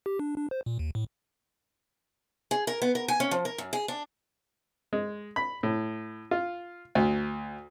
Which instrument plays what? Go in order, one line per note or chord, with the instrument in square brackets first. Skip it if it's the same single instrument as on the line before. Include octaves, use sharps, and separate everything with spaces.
[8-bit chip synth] G4
D4
D4
C5
A#2
D#2
A2
[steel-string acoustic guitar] G#4
A#4
B3
A#4
G#5
C#4
F3
A#4
F#2
G#4
D4
[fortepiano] G#3
B5
A2
F4
D2